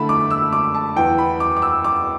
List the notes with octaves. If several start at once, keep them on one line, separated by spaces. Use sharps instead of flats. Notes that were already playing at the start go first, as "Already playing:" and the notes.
Already playing: D3 A3 E4 A5 B5
D6
E6
D6
A5
E2 E3 B3 G5
B5
D6
D6
E6
D6